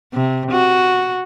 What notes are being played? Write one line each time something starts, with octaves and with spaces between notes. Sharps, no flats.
C3
F#4